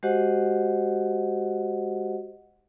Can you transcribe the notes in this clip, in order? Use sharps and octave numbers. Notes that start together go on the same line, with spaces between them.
G#3 F#4 G4 C5 D#5 F#5